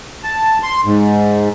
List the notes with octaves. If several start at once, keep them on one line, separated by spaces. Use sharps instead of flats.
A5
C6
G#2